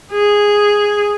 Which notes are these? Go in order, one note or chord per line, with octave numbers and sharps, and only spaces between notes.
G#4